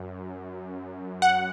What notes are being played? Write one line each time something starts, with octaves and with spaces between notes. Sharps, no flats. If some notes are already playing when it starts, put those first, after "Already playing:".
Already playing: F#2
F#5